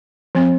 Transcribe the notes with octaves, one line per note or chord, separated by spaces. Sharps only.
F3 C4